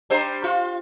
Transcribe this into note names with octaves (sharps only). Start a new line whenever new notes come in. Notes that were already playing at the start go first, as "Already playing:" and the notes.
G3 D4 C5
F4